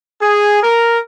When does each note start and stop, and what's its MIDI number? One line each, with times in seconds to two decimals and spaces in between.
0.21 0.60 68
0.63 0.99 70